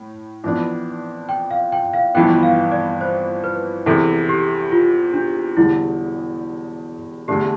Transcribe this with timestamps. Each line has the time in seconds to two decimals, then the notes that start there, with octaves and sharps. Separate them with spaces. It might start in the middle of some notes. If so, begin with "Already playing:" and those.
Already playing: A2
0.44 F2 E3 B3 D4
1.29 G5
1.51 F5
1.72 G5
1.93 F5
2.15 G1 F2 E3 B3 G5
2.43 F5
2.72 D5
3.01 C5
3.44 B4
3.86 E2 C3 E3 A4
4.29 G4
4.72 F4
5.14 D4
5.57 E1 E2 D3 G3 E4
7.28 E2 D3 A3 D4 G4